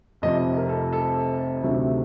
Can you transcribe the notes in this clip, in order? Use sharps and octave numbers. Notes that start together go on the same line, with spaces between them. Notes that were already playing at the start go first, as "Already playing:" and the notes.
F1 F2 C3 D#5
A#4
A4
A4
D2 C3 D#3 F#3 A3